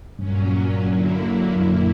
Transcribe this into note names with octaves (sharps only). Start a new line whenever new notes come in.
G2 A#2 F#3 C#4
D3 F#3 A#3 E4
F#2 A#2 A#3 E4